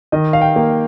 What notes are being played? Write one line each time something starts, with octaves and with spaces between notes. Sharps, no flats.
D#3 D#5
F5
G5
A#3